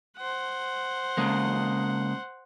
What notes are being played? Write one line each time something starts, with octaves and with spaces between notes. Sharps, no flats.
C5 F#5
C#3 G#3 A#3